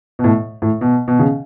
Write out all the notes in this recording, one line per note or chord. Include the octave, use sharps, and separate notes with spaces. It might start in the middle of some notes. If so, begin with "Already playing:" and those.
B2
A2
A2
B2
B2
C#3